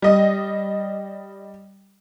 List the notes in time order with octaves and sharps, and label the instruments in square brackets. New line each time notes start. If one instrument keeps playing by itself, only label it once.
[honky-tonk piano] G3 D#5